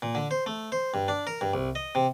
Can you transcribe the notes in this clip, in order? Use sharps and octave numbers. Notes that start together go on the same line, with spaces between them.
A#2
D3
C5
A3
C5
G2
D4
A#4
G2
C2
D#5
C3